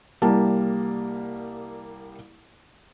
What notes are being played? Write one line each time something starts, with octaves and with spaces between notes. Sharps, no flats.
C2 G3 A#3 A5